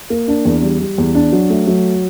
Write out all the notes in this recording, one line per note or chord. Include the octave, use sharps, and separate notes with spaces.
A#3
D4
E2
G3
G3
E2
D4
F#3
A3
F#3